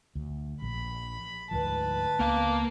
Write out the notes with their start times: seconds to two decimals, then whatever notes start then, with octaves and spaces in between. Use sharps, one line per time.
0.15 D2
0.62 A#1 B5
1.51 D2 G#2 F3 B4 A5
2.20 C#2 A#3 B3 F5